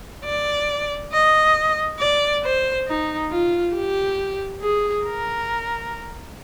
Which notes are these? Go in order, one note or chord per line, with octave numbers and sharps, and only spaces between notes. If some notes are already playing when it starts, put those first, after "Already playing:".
D5
D#5
D5
C5
D#4
F4
G4
G#4
A#4